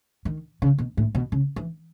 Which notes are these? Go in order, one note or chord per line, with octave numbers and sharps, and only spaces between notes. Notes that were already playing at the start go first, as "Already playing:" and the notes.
D#3
C#3
B2
A2
B2
C#3
E3